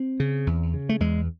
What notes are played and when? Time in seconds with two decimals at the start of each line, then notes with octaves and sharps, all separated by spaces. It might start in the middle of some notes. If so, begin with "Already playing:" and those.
Already playing: C4
0.20 C#3
0.47 E2
0.74 C#3
0.89 A3
1.00 E2 G#3